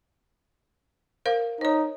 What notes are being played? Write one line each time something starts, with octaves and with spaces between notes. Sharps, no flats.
A#4 C5 F5
D#4 C5 C#5